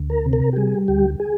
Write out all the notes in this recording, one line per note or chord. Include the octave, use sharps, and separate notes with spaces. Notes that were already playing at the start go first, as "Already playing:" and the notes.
Already playing: D2
A#4
C3
A#4
G4
G3 G#4
D2 G4
G#4